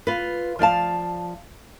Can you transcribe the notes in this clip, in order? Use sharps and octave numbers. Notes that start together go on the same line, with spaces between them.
F4 B4
F3 D5 F5 A5